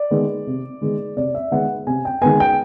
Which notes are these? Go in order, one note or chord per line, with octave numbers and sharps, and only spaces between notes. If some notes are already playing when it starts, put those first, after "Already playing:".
Already playing: D5
D#3 G#3 B3
C3
D#3 G#3 B3
C3 D5
E5
D#3 G#3 B3 F#5
C3 G#5
G5
D#3 G#3 B3 G#5
G5